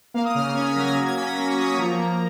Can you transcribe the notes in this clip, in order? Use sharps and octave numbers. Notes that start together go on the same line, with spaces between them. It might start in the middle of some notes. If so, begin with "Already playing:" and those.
A#3 F5
D#6
C#3 F6
C#4 G#6
B6
F#3 A#6
G#6
A#3 A#6
G#6
C#4 B6
A#6
A#3
C#6
A#3 D#6
C#6
F3 A#5
A#3